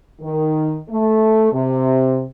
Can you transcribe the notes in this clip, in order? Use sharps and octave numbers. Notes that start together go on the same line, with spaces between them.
D#3
A3
C3